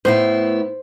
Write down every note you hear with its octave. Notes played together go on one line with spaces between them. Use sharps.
A2 B3 E4 C5